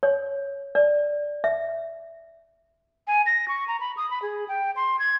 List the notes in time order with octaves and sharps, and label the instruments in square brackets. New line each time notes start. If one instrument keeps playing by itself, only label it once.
[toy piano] C#5
D5
E5
[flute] G#5
A#6
C#6
A#5
B5
D#6
B5
G#4
G5
C6
G#6